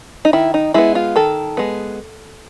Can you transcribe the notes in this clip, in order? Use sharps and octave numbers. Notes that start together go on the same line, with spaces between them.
D#4
D#3 E4
D#4
G#3 B3 E4
F4
D#3 A4
G#3 B3